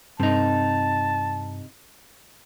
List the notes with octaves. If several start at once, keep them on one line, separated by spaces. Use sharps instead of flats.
G2 C3 D#4 A5